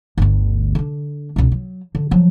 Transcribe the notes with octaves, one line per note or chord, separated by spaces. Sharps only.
G1 D2
D3 D4
C#2 B2
F#3
D3
F3 F#3